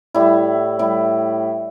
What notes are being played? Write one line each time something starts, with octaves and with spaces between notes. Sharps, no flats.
A2 G3 E4
A2 G3 E4